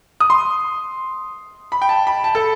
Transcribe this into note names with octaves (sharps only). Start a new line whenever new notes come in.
D#6
C6
B5
G5
A5
B5
A5
A4